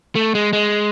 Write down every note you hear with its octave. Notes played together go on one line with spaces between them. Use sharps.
A3
G#3
G#3